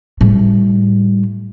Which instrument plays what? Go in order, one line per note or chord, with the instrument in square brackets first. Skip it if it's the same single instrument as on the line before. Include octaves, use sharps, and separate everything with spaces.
[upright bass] A2 G3